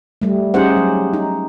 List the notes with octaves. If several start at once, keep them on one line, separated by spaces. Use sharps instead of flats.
G3 A3
C#4 D#4 G4 G#4 C5 F#5
F#3
D#4